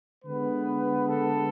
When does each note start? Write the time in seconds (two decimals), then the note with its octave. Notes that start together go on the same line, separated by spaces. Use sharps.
0.24 D3 G#3 B3 B4
1.09 A4